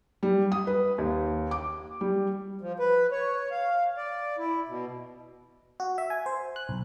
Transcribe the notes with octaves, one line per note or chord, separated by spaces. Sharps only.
G3
D#6
B4
D#2
D6
G3
F3
B4
C#5
F5
D5
E4
B2
F#4
E5
G#5
C5
F#6
B1